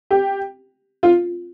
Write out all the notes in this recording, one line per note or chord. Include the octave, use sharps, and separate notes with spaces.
G4
F4